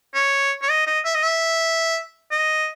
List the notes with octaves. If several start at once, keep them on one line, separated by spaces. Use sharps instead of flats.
C#5
C#5
D#5
D#5
E5
D#5
E5
D#5